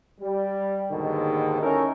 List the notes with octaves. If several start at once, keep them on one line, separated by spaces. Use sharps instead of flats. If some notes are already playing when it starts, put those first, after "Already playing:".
G3
D#2 G#2 B2 D3 D#3
C#4 D#4 E4 A4 A#4